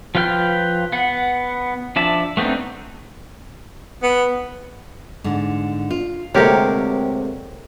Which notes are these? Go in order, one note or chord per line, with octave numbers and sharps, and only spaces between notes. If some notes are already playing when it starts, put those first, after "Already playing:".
F3 F4 B4 G5 F6
B3 F#5
F3 D4 E5 A5
A3 B3 C4 D4 D#4
B3
G#2 D3
F4
D2 C3 G#3 A#3 C4 G4 A#4 C#5